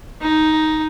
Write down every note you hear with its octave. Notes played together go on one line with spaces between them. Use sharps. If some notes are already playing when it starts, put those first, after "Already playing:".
D#4